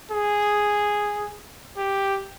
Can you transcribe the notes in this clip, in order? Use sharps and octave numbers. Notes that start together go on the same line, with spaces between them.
G#4
G4